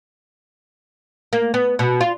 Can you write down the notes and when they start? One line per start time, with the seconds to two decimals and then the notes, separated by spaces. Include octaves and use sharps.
1.33 A#3
1.54 B3
1.79 B2
2.01 F4